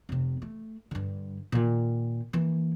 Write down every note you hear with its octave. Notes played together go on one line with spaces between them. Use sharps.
F1 C3
A3
G2 D3
A#2 D#3
E3 A#3